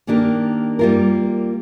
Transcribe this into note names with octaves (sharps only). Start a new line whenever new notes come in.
D#3 A#3 D4 G4 A#4
G3 A#3 F4 A#4